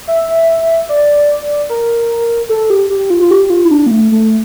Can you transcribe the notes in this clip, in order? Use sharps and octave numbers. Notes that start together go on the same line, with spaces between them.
E5
D5
A#4
A4
G4
G4
F4
F4
G4
F4
E4
D4
A#3
A3
A3